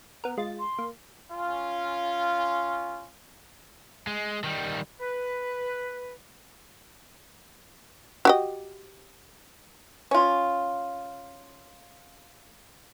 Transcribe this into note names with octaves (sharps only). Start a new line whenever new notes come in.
B3 A#4
G#3 F4 A6
C6
A#3
C#4 F4
G#3
D#3 G3
B4
F#4 G4 D#5
C#4 F4